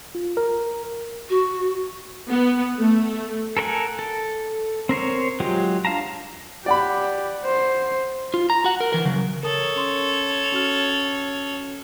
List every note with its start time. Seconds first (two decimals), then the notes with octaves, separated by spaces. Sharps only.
0.15 F4
0.37 A#4
1.29 F#4
2.30 B3
2.79 A3
3.57 A4 A#4 C5 F#5 G#5
3.99 A4
4.89 C4 A#4 C5 C#5
5.40 F#3 G#3 F4 G4
5.85 D4 F5 A5 A#5
6.66 G4 D5 F#5 B5
7.45 C5
8.34 F4
8.50 A#5
8.64 F#4 F#5
8.80 A#4
8.93 E3 A#4
9.05 C#3 F#3
9.43 A4 A#4 C#5 D#6
9.76 C#4 C6
10.52 C#4 F#4 F6